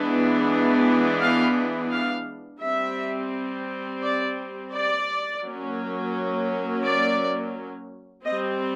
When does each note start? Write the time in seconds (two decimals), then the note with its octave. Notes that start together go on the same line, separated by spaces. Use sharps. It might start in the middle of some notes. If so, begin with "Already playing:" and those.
Already playing: E3 G#3 B3 D4
1.21 F5
1.91 F5
2.61 G3 C4 E5
4.03 D5
4.73 D5
5.43 F#3 A#3 C#4
6.84 D5
8.24 G3 C4 D#5